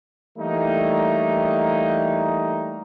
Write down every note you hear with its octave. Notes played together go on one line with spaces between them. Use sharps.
E3 G3 A3 A#3 D#4